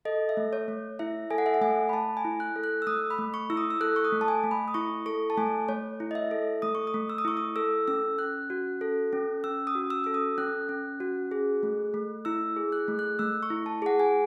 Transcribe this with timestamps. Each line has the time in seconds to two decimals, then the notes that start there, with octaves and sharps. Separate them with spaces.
0.05 A4 D#5
0.29 E5
0.37 A3
0.53 C#5
0.68 A3
0.99 E4 E5
1.31 A4 G#5
1.38 F#5
1.46 E5
1.54 F#5
1.61 A3 G#5
1.89 B5
1.93 A3 A5
2.17 G#5
2.24 E4
2.40 F#6
2.56 A4
2.64 F#6
2.82 E6
2.87 A3 D#6
3.10 B5
3.18 A3
3.34 C#6
3.50 E4 E6
3.57 D#6
3.70 E6
3.81 A4 F#6
3.96 C#6
4.05 D#6
4.12 A3
4.21 A5
4.28 G#5
4.44 A3
4.51 B5
4.68 D#6
4.74 E4 C#6
5.06 A4 C#6
5.30 A5
5.37 A3 G#5
5.69 A3 C#5
6.00 E4
6.11 D#5
6.15 E5
6.31 A4
6.62 A3 D#6
6.75 C#6
6.87 D#6
6.94 A3
7.10 E6
7.18 D#6
7.25 E4 C#6
7.37 D#6
7.56 A4 E6
7.88 C#4 E6
8.18 C#4 F#6
8.50 F#4
8.81 A4
9.13 C#4
9.44 C#4 E6
9.67 D#6
9.75 F#4
9.90 E6
10.04 A4 E6
10.14 D#6
10.38 C#4 F#6
10.69 C#4
11.00 F#4
11.31 G#4
11.63 A3
11.94 A3
12.25 E4 E6
12.57 G#4
12.72 F#6
12.88 A3
12.99 F#6
13.19 A3 E6
13.43 C#6
13.50 E4
13.66 A5
13.82 G#4 F#5
14.00 G#5